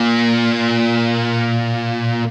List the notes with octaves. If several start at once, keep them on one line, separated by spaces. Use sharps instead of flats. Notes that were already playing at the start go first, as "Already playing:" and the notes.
Already playing: A#2